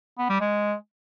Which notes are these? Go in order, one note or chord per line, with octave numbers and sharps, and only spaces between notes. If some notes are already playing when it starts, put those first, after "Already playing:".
B3
G3
G#3